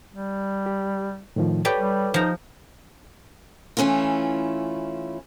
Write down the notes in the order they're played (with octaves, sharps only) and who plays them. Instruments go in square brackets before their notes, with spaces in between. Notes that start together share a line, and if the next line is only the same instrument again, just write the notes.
[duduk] G3
[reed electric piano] G4
A2 D#3 F3
[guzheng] G4 D5 [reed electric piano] A4 B4 C#5
[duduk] G3
[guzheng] F3 A#5 [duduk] D#4
[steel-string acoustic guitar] E3 A3 C#4 E4 F4